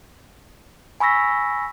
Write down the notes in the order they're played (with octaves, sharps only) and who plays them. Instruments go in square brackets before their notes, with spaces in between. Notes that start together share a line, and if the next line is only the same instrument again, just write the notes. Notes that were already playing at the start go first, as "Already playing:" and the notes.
[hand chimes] G#5 B5 C#6 E6 A#6 B6